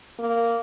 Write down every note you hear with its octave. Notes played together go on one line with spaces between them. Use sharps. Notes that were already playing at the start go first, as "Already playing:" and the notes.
A#3